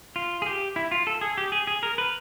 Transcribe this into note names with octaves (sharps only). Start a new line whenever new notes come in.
F4
G#4
G4
E4
F4
A4
G#4
G4
G#4
G#4
A#4
B4